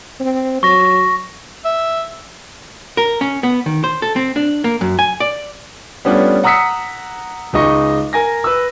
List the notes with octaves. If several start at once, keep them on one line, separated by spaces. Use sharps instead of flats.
C4
F#3 C#6 A#6
E5
A#4
C#4
B3
D#3
C5
A4
C4
D4
A#3
F#2
G#5
D5
G3 A3 B3 C#4 D4 F4
F#5 A#5 D#6 E6 B6 C#7
C#2 G#3 D#4 D#5 C#6
A#4 G#5 A#6
B4 E6